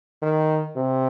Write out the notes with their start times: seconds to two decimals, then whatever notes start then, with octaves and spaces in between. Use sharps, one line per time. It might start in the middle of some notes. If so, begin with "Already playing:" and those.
0.22 D#3
0.76 C3